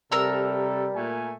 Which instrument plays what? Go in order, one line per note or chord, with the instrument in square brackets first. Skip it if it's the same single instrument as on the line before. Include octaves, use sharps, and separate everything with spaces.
[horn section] C3 A4 [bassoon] G3 [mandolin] A#4 A#5 E6
[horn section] A#2 A3 G#5